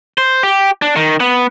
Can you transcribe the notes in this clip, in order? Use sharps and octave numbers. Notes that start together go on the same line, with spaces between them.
C5
G4
D4
D#3
B3